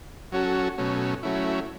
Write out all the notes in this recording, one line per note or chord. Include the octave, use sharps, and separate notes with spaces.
F#3 C#4 F#4 A4
B2 F#3 A3 C#4
F#3 A3 C#4 E4